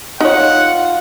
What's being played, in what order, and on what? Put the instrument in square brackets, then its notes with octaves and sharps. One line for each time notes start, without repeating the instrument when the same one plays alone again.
[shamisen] D#4 C#5 [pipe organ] F4 [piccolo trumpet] F#5